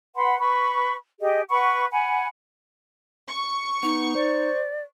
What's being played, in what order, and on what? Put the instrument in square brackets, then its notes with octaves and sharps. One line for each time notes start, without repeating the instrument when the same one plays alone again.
[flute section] B4 F#5 B5 C6
B4 B5 C#6
G4 G#4 D#5
B4 F#5 B5 C#6
F#5 G#5 B5
[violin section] C#6
[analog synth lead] B3 [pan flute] D#4
[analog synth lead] C5 [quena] D5